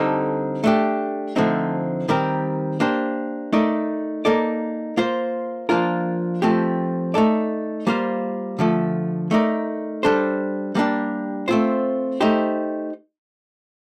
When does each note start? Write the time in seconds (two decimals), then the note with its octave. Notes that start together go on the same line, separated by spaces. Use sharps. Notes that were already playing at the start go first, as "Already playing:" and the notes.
Already playing: D3 G3 C4 D#4 A4
0.64 A3 D4 G4
1.36 D3 F3 A3 C4 D#4
2.08 D#3 G3 C4 G4 A#4
2.80 A#3 D4 G4 C5
3.53 A3 D#4 A#4 D5
4.25 A#3 D#4 A4 D5
4.97 A#3 F4 C5
5.69 F3 A#3 D4 F4 A#4
6.42 F3 A3 C4 G4
7.14 A3 D#4 A4 D5
7.87 G3 A#3 F4 C5
8.59 D3 F3 A3
9.31 A3 D#4 A#4 D5
10.03 G3 D4 A4 C5
10.75 G3 A#3 D4 G4
11.48 A3 C4 F4 C5
12.21 A3 D#4 G4 C5